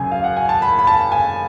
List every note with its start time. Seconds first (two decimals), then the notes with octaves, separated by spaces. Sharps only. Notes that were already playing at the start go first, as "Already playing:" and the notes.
Already playing: F#2 C#3 G#5
0.11 F5
0.24 F#5
0.37 G#5
0.49 A5
0.62 B5
0.79 B5
0.87 A5
1.12 G#5